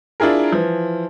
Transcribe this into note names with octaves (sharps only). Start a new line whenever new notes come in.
D4 E4 F4 G#4 A#4
E3 F3